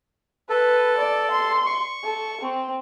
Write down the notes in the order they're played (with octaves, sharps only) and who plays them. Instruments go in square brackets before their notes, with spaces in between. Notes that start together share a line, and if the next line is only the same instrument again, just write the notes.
[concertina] A4 [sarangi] B4
[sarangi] D5
C6
[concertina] C#6
[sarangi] A4
C4